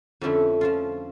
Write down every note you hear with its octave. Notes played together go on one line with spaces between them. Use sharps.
F2 D3 A3 C#4 E4
F3 C#4 F4